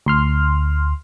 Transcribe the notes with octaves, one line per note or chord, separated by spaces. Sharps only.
D2 C6 F6